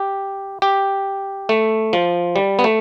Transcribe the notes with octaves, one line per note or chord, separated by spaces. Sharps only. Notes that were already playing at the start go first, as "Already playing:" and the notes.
Already playing: G4
G4
A3
F3
G3
B3
A3